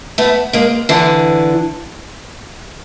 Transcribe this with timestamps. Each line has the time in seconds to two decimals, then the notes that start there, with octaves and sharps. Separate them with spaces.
0.18 A3 B3
0.53 G#3 A#3
0.89 D3 E3